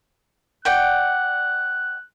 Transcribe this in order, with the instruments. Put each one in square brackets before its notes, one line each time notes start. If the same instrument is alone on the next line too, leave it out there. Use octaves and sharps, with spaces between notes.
[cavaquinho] D5 F#5 G5 [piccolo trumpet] F#6